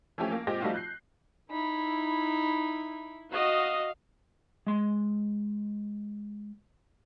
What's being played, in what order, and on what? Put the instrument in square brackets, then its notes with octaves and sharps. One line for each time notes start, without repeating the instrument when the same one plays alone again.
[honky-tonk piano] E3 F3 A3 C#4 G4
A#3
A#2 G#3 C4 G4 D6 A#6
F3 G3 A3 D#4 F4 F#4
F#6 G6 C7
[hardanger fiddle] D#4 B5 [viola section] E4
[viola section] F#4 D#5 [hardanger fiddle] F5
[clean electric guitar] G#3 C6